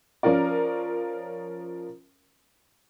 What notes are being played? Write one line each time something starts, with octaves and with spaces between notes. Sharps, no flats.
F3 C#4 F4 A#4 D5